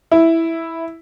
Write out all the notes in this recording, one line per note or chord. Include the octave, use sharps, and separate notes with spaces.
E4